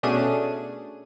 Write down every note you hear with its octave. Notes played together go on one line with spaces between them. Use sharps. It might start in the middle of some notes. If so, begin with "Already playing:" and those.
B2 A3 C#4 D4 G#4 D#7